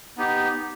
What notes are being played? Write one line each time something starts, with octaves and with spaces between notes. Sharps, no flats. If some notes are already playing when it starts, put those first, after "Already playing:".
B3 D#4 G4